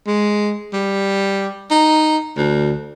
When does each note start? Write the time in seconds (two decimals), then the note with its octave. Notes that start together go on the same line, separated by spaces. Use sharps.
0.07 G#3
0.73 G3
1.71 D#4
2.36 D2